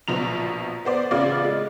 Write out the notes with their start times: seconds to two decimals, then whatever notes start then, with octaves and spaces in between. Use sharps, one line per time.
0.08 A#1 B2 F3 A#5 F7
0.85 B3 C5 D5
1.11 A1 C#3 F4 D5
1.44 G#3